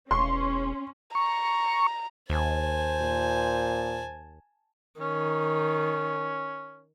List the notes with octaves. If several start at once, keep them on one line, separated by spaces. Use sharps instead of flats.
E1 C#4 C6 C#6
A#5 C#6
D#2 C5 G#5 A5
A#2
D#3 C#4